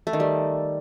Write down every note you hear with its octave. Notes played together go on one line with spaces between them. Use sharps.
A3
D#3
G3